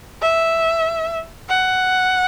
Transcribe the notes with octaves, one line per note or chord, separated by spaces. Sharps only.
E5
F#5